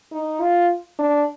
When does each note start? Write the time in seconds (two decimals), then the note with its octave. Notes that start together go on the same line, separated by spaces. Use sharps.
0.12 D#4
0.41 F4
0.99 D4